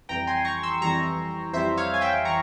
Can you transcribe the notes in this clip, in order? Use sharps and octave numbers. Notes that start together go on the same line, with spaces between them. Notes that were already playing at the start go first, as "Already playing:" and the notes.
F2 E3 G3 G5 A#5
G#5 C6
A#5 C#6
C6 E6
F2 E3 G3 A#5 C#6
F2 E3 G3 C5 E5
C#5 F5
G#5
E5 G5
E3 A#5 C#6